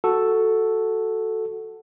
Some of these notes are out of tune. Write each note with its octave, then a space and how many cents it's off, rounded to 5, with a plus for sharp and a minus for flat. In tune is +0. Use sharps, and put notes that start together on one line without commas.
F#4 +0 A4 +0